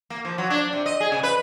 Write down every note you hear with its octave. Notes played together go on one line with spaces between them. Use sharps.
A#3
F3
F#3
D4
C3
D#5
G#4
C#3
B4